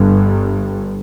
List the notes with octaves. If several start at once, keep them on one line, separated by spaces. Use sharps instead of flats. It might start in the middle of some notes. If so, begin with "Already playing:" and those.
Already playing: G1 G2